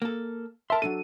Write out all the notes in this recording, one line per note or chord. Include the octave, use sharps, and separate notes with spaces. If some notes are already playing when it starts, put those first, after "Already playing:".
A#3 A4
A#4 E5 A5 C6
F#3 D4 A4 D#7